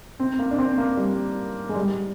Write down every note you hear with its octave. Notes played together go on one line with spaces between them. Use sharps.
C4
A#3
D4
C4
A#3
G3
G#3
G3